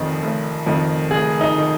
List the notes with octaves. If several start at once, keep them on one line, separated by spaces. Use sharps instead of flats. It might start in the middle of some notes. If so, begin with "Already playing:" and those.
Already playing: F1 F2 D#3
F1
F2 D#3
F1 G#4
D#4
D#3